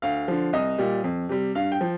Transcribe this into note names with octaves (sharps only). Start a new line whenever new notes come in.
D2 F5
D3 F3
C2 D#5
A#2 G3
F2
C3 G3
G2 F5
G5
F3